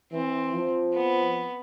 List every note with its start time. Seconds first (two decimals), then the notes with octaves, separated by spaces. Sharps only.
0.12 E3 C4
0.53 F3
0.93 B3